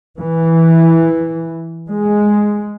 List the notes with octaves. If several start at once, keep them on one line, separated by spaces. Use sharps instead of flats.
E3
G#3